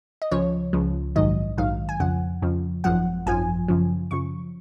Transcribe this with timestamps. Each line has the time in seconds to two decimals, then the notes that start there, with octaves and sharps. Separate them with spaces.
0.22 D#5
0.32 C#2 C#3 F3 C#5
0.73 C#2 C#3 F3
1.16 A#1 G#2 D#3 F#3 D#5
1.57 A#1 G#2 D#3 F#3 F5
1.89 G#5
2.00 F2 C#3 F3 F#5
2.42 F2 C#3 F3
2.84 G#1 F#2 F3 F#5
3.26 G#1 F#2 F3 G#5
3.68 F#2 C#3 F3
4.11 F#2 C#3 F3 C#6